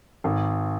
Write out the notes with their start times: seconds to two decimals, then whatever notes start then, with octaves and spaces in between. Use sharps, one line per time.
0.24 G#1